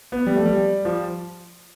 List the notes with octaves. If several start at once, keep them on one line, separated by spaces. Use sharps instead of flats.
B3
G3
A3
G3
F3